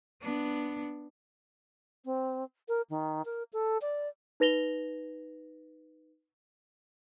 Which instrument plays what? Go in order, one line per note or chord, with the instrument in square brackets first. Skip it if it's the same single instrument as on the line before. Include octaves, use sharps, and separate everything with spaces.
[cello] B3 D4
[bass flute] C4
A#4
D#3
A#4
A4
D5
[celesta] D#4 B4 A#6 F7 G7